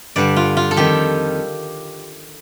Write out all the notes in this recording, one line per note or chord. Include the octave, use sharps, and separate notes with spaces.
G2 D3 G3 D5
F4
F4
A4
F2 D#3 G3 G4